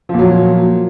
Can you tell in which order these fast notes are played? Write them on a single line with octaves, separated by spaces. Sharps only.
F3 A#2 F#3